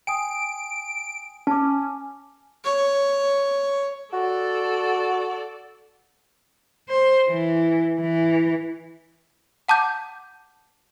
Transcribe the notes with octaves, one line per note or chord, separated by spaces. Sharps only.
G5 G#5 D#6 D7
C#4 A5 D6
C#5
F#4 A4 D5
C5
E3
E3
F#5 A5 D6 G6